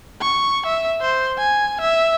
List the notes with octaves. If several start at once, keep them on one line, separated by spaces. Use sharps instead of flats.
C#6
E5
C5
G#5
E5